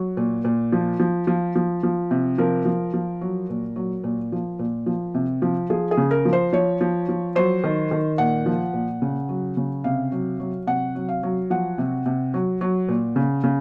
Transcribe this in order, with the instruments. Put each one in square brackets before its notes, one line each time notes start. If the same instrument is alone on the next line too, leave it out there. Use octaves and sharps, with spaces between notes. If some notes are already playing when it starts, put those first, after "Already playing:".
Already playing: [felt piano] F#3
A#2
A#2
F3
F3
F3
F3
F3
C3
F3 A#4
F3
F3
F#3
A#2
F#3
A#2
F3
A#2
F3
C3
F3
F3 G#4
G#4
C#3
A#4
F3
C5
F3 C#5
F3
F3
F#3 C5
D#3
D#3
A#2 F#5
F3
A#2
C#3
F#3
C#3
C3 F5
F#3
F#3
C3 F#5
F#3
F5
F#3
F3 F#5
C3
C3
F#3
F#3
A#2
C#3
C#3